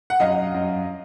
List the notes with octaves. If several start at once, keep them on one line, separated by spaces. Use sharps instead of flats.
F#5
F#2 D#5 F5
F#2